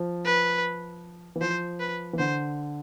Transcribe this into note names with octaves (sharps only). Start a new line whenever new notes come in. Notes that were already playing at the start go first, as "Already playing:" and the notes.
Already playing: F3
B4
E3
F3 C5
B4
E3
D3 C5